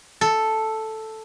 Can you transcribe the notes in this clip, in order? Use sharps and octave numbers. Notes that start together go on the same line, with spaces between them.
A4